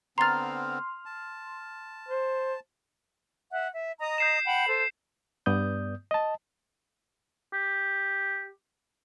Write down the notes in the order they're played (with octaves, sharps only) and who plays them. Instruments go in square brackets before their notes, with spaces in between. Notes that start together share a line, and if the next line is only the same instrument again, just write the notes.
[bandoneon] D3 B3 C4 [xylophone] A#5 A6 [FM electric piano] C6 F6
[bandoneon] A5
[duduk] C5
[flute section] E5 F#5
E5
D#5 A#5 D#6
[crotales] G6 C7 E7
[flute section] F#5 G5 B5
A4 C5
[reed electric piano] G2 B3 D5 D#6 G6
D#5 A5
[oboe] G4